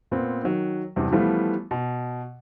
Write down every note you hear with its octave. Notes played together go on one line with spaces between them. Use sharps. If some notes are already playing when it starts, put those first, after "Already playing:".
A#2 B3 C4
D#3 F#3
E2 G2 C3 E3
E3 F3 G3 A3 B3 F4
B2